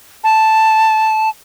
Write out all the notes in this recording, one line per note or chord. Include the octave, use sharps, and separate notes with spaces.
A5